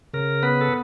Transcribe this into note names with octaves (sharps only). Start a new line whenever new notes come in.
C#3 A#4
B3 B4
A4